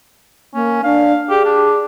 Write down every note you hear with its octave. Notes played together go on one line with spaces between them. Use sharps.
A#3 C#4
D4 F5
G4 G#4
D4